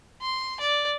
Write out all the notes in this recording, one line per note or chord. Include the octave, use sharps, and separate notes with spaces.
C6
D5